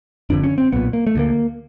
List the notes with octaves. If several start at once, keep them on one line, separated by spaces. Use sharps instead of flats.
F#1 F2 D3 D4
C#4
C4
B1 A#2 B3
A#3
A3
D2 D3 A#3